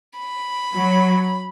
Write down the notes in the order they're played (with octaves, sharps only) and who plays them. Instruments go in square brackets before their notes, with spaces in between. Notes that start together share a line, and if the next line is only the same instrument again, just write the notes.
[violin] B5
[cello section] F#3